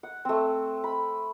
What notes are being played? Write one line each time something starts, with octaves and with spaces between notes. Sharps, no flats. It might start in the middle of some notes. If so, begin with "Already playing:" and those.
F#5
A3 C4
B5